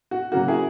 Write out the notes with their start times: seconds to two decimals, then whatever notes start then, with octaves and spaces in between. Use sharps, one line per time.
0.11 F#4
0.32 C#3 F#3 A#3 F#4
0.48 E4 G#4